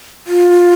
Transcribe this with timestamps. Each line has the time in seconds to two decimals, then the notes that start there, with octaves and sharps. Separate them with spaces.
0.27 F4